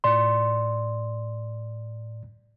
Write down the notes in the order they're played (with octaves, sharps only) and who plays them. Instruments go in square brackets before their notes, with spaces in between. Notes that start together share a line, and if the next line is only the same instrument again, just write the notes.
[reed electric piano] A2 D5 C6